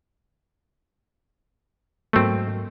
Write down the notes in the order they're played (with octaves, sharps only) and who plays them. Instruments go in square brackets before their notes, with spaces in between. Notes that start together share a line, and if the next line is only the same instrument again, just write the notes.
[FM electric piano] G#2 F#3 A#3 [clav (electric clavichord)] A3 C4